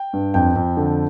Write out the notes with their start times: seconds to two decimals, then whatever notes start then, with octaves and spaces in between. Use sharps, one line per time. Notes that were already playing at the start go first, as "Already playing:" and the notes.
Already playing: G5
0.13 G2
0.34 F2 G5
0.56 F2
0.77 D3